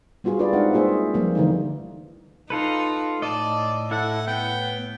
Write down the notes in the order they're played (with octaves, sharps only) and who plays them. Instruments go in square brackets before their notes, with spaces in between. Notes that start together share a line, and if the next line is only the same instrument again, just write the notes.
[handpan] G3 B3 F4 F#4 G#4
D4 F4 G4 B4 D5
G#3 C4 D#4 E5 F#5
A#3 F4 G#4 C5 E5
F3 G3 A#3 C4
D3 E3 A3 D#4
[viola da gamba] D#4 [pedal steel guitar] F4 A4 B4
[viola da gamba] A2 [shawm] D5 [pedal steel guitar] D#5 A5
[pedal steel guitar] E4 A4 [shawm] F#5
[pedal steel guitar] B3 [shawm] G5